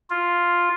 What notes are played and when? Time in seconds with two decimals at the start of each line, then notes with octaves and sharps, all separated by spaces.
0.10 F4